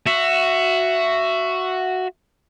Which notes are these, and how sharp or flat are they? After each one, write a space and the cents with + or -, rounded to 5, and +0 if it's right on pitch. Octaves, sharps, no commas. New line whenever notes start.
F#4 +0 E5 +20